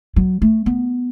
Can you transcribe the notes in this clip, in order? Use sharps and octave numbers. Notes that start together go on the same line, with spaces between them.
F#3
A3
B3